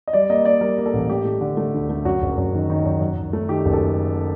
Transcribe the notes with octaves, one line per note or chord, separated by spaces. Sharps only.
D#5
G3 D5
A#3 D#5
A#3 D5
G3 A#4
A#3
A4
A1
A3 G4
A3
D3
A3
D2
A3
F#2 F#4
F#1
F#2
D#3
D#3
F#2
F#2
F#2
A3
D#3 G4
F#1
A4